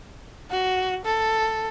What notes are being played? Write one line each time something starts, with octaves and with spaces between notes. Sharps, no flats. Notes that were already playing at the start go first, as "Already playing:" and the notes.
F#4
A4